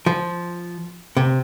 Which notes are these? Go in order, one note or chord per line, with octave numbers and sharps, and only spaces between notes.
F3
C3